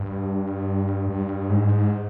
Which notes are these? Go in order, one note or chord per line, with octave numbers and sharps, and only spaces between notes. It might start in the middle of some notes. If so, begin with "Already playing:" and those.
Already playing: G2
G2
G#2